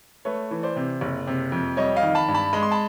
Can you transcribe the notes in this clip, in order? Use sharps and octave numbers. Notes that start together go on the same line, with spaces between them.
A3 B4 C#5
E3
C5 D5
C3
F#1
C3
F2
G3 C#5 D#5
D#5 F5
D#3
A5 B5
G2
A5 B5
G#3 B5
C6
A5 B5